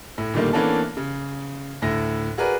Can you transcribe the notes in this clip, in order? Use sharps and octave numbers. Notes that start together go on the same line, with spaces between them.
A2
A#2 D3 D#3 G3 A3 A#3
E3 A#3 B3 C#4 D4 A4
C#3
D2 A2 A#6
F#4 G#4 A#4 B4 D5